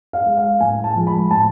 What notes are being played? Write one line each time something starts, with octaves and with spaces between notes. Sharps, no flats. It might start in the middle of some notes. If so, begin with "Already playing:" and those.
F5
G#3
F5
A2 G#5
A5
F3 G#3
B5
A2 A5